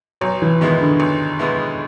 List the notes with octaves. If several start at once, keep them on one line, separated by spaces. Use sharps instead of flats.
B1 F#3
E3
B2 D#3 G#3 B3 E4
D3
B1
B2 G#3 B3 E4